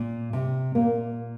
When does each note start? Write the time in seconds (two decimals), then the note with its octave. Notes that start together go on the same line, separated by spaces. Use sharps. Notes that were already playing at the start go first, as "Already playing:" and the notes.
Already playing: A#2
0.33 C3
0.75 A#2 A#3